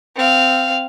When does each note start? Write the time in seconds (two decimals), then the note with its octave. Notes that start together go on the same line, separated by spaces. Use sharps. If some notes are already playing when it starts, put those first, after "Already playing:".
0.16 C4 F5